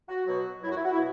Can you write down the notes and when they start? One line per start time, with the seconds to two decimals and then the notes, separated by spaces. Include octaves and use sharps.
0.09 F#4
0.26 B2 F#3 F#4
0.62 F#3 E4
0.67 F#2 F#4
0.77 E4
0.85 F#4
0.92 E4
0.98 B2